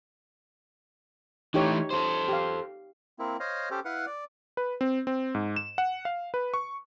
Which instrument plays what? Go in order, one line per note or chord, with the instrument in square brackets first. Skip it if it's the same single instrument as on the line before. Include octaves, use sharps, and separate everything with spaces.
[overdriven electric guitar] E3 A3 [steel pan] D#4 G4 C#5
[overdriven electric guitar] A4 C5
[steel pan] G4 F5
[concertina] A#3 C4 E4
C5 C#5 D#5 F5
C#4 G4 A4 C5
E4 B4 F5 F#5
D5
[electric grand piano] B4
C4
C4
G#2
E7
F#5
F5
B4
C#6